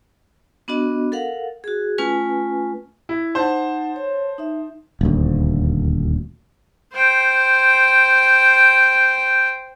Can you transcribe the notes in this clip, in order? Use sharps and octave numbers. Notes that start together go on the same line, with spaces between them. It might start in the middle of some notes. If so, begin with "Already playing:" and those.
B3 D4 F#4 D#5
A4 A#4 F5 F#5
F#4 G#4
A3 C#4 F4 B4 G#5
E4
D#4 C5 F#5 A5
C#5
D#4 E5
D#1 D2
C5 G5